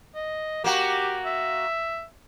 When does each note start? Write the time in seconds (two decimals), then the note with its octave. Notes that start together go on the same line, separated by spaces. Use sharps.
0.15 D#5
0.64 A#3 F#4 G4
1.26 E5